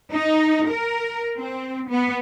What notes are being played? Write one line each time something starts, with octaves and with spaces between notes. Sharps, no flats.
D#4
A#4
C4
B3